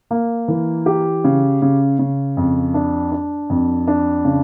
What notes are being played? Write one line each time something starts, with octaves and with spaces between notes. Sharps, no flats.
A#3
E3
G4
C#3
C#3
C#3
F2
D4
D4
F2
D4
C#3